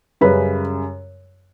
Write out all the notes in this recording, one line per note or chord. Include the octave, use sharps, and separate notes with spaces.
F#2 C#3 G3 B4